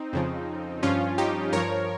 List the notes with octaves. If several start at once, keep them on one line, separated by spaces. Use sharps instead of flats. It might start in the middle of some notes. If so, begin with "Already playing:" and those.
Already playing: C4 D#4
F2 C#3 F3
G2 F3 C#4 F4
D#4 G4
G2 F3 A#4 C#5